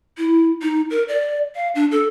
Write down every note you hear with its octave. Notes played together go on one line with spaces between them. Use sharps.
E4
D#4
A#4
D5
F5
D4
A4